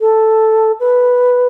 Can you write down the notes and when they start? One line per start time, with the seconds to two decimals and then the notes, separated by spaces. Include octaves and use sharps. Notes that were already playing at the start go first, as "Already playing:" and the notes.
0.01 A4
0.80 B4